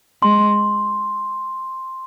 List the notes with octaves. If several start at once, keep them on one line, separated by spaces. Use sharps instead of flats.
G#3 C6